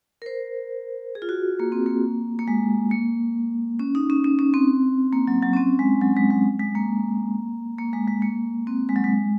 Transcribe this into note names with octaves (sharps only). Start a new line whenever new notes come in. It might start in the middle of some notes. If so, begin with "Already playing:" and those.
A#4
C5
G#4
F4
F#4
A#3
C4
A#3
A#3
G#3
A#3
C#4
D#4
C#4
C#4
C#4
C4
A#3
F#3
F#3
C#4
C4
G#3
F#3
G#3
G#3
G#3
A#3
A#3
G#3
G#3
A#3
C4
G#3
F#3
G#3